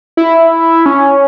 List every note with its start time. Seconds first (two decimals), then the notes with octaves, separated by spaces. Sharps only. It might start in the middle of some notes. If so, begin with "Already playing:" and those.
0.17 E4
0.86 C#4